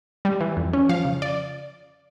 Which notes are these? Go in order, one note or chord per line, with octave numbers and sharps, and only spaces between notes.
G3
E3
F2
C#4
F3 F5
C#3
D5